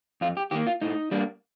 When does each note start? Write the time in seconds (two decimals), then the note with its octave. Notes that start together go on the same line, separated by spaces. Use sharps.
0.21 F2 F4
0.37 G4
0.51 D#3 A#3 G4
0.67 F4
0.81 A2 D#4
1.11 G3 A#3 D4